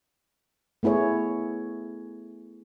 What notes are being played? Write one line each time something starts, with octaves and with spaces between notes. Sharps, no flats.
A3 B3 E4 G#4 C#5